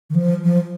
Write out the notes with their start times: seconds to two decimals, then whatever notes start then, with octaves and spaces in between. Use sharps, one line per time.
0.10 D#3
0.15 F3
0.44 F3